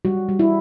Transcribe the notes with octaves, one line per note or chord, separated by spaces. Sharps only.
G3 F#4
G3
E4